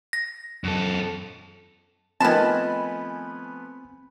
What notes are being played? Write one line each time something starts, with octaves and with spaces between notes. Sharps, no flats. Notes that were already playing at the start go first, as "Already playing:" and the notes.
A#6
F#2 A4
D#3 F3 A3 B3 C4 G#5 A5 B5